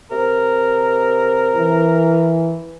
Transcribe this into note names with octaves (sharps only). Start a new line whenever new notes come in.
C3 A#4
E3